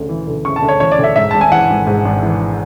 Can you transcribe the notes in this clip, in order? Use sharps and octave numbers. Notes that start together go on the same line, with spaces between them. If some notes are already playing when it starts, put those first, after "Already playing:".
Already playing: D2 C#3
E3
D2
C#3 C#6
A5
D2
C#5
E3 C#5
D5
D2
E5
G#2 E5
G#1 A5
G#5
E3 F#5
G#1
G#2
G#1
E3